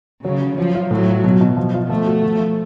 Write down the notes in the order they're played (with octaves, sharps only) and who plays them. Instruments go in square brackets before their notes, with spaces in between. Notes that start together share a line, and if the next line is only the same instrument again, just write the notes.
[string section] C#3 [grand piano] F#3
[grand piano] F#3
[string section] F3 [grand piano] F#3
[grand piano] F4
[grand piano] A2 [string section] F#3
[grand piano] F4
B2
B2
F3
F4
[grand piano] F3 [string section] A3
[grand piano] F#4
F3
F3